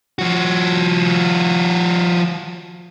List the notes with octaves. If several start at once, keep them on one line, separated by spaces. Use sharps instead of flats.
F3 F#4